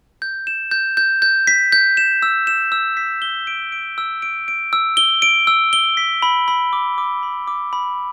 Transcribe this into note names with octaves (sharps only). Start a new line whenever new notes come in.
G6
E7
G6
G6
G6
B6
G6
E7
E6
E7
E6
B6
G7
D7
D7
E6
D7
D7
E6
G7
D7
E6
G7
B6
B5
B5
D6
D6
B5
D6
B5